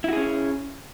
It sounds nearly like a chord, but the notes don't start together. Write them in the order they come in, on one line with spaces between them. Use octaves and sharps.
E4 F#4 G#4 C#4